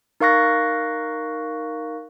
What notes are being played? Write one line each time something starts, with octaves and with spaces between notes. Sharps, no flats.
D#4 A#4 F5 C#6 F#6 A#6